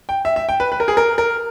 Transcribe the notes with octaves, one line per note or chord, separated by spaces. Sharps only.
G5
E5
E5
G5
B4
B4
A#4
G#4
A#4
A#4